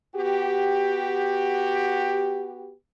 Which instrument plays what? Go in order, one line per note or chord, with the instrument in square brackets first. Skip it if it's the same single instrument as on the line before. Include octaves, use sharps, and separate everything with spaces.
[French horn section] B3 F#4 G4